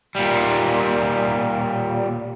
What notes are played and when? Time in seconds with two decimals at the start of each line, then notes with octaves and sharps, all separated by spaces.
0.16 A#2 G3